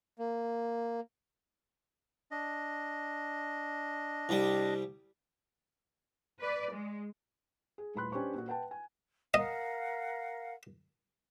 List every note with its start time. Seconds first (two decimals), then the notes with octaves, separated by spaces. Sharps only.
0.19 A#3
2.31 D4 D#5
4.29 C2 G3
6.40 B4 D5
6.72 G#3
7.78 G#4
7.95 D#1 A2 B4 B5 C6 F#6
8.12 C#4 D4 G4 B4 C5 C#6
8.34 A#2 F#4
8.47 B4 F#5 G5 A5
8.71 G#5
9.34 A#4 D#5 F5 F#5